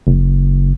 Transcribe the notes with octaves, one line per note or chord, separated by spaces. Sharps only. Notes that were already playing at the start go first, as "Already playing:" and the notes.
F#1